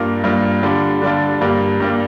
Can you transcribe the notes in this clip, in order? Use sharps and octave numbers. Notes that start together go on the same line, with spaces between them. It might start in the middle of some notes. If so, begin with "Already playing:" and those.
Already playing: G2 G3 A#3 F4
G2 G3 A#3 F4
D3 G3 D4 F4
D3 G3 D4 F4
G2 G3 A#3
G2 G3 A#3